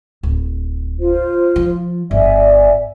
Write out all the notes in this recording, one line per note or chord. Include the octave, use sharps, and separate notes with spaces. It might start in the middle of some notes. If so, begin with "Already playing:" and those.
D1
F4 C5
F3
G1 D5 E5 G#5